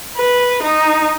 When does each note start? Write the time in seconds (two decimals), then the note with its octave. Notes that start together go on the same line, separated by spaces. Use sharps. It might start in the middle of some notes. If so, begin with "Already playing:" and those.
0.17 B4
0.62 D#4